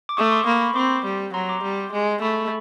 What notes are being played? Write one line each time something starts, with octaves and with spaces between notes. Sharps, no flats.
D6
A3 C#6 D#6
C6 D6
A#3 B5 C#6
B5 C#6
C4 C6 D6
G3
F#3 A#5 C6
C6 D6
G3
G#3
A3 B5 C#6